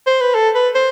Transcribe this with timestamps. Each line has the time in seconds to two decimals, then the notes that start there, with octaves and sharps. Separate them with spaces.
0.07 C5
0.21 B4
0.35 A4
0.55 B4
0.75 C5